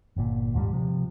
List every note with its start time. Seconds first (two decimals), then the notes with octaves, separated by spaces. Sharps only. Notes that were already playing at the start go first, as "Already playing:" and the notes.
0.16 G1 A#2
0.54 D#2 G#2 F#3 G3
0.73 C3 F3